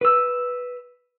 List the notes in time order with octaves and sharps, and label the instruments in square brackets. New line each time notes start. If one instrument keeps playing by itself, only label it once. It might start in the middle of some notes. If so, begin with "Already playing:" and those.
[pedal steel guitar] B4 E6